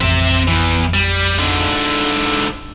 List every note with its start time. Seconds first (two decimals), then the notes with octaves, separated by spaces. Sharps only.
0.01 A1 F2 C4 E5
0.48 E2 E3
0.94 G3
1.39 G#2 D3